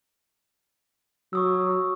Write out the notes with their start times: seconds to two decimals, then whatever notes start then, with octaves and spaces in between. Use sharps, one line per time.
1.33 F#3 C#6 D#6 E6